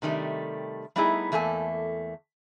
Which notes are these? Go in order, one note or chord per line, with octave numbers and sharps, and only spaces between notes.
C3 D#3 G3 A3
G3 A3 B3 D#4 E4 G#4
E2 A3 A#3 A4 G#5